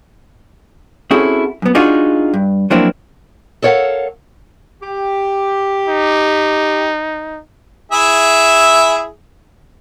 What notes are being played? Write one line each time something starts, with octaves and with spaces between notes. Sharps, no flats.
C4 C#4 E4 F#4 G#4 A4
F#2 B3
D4 D#4 F4 F#4 G#4
G2
F3 F#3 A#3 C4 D4 E4
A4 A#4 C#5 D5 F5 F#5
G4
D#4
E4 G#4 E5